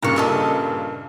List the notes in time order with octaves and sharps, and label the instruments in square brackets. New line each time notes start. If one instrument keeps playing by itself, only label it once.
[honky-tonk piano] G2 A#2 C#3 [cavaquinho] A#5 C#6
[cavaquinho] A4 D#5 E5